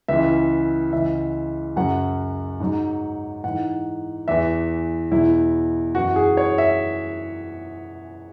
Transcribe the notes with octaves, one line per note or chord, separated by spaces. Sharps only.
C#2 C#3 E3 E5
C#2 C#3 E3 E5
F#2 C#3 F#3 F#5
G#2 F#3
G#2 E3 F#5
E2 E3 E5
E2 B2 F#3 E4
F#2 E3 F#4
G#4
C#5
E5